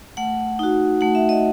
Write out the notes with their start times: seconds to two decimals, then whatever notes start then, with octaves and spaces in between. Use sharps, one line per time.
0.17 A3 F#5
0.59 D#4 F#4
1.01 A3 F#5
1.15 E5
1.29 D#5